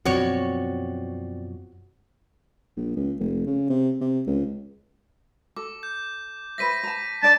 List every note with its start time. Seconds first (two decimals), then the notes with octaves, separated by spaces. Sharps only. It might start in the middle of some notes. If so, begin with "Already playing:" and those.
0.05 F#2 B2 F3 C4 F#4 C#5 D5
2.77 A#1
2.96 C#2
3.20 F1
3.46 C#3
3.70 C3
4.01 C3
4.27 C#2
5.56 A4 D6
5.83 G6
6.58 B4 C5 E5 A#6 B6 D#7
6.83 A5 A#5
7.23 D4 D5 A5 A#5